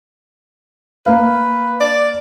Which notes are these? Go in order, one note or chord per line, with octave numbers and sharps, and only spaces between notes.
A#3 B4 F5
D5